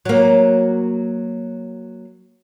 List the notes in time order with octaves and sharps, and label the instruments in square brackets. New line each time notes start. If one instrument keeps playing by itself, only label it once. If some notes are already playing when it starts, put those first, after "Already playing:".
[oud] F#3 A#3